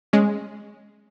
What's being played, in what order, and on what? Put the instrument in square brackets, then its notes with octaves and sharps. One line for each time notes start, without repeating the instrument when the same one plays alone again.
[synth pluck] G#3 C#4